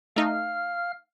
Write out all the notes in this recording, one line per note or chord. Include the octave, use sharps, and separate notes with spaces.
A3 D#4 F5 F6